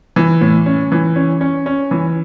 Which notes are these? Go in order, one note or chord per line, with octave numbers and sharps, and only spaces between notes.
E3
A2
C#4
E3
C#4
C#4
C#4
E3